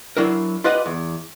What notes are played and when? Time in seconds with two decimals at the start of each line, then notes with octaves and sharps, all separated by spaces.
0.17 F#3 D4 E4 A#4
0.64 F4 G4 B4 D5 D#5 F#5
0.86 E2